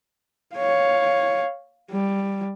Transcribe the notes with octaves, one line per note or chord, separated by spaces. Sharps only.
C#5 F5
G3